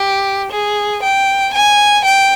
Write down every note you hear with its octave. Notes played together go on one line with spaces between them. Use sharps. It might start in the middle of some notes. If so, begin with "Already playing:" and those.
Already playing: G4
G#4
G5
G#5
G5